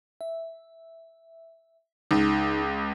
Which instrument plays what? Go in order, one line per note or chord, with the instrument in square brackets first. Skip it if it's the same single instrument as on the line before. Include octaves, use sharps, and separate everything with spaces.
[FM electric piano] E5
[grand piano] C#2 [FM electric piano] D#4